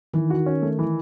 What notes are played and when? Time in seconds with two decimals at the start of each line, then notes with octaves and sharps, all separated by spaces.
0.14 D#3 E3
0.30 F#4
0.46 C#4
0.62 A3
0.79 E3